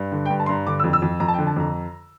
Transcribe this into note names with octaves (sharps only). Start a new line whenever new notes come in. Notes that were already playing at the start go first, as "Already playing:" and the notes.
Already playing: G2
D3
G5
G2
A5
C6
G2 A#5
D3 D6
E6
F2
E6
F2
F2 A#5
A5
G5
D3
A5
F2 A#5